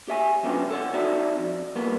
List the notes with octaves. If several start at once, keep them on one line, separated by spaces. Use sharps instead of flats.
G4 E5 G#5
F#2 B2 D3 F4 G4 B4
A4 C#5 F#5
C4 D#4 F#4 D5 E5 A#5
F2
A#2 G3 A#3 B3